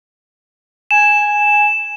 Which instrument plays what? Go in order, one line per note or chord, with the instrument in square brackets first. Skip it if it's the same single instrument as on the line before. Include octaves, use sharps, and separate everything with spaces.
[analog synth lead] G#5 [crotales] E7